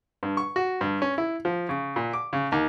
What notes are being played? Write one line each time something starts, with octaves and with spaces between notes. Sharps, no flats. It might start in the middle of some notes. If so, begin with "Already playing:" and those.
G2
C#6
F#4
G2
C#4
E4
F3
C#3
A#2
D6
C#3
D#2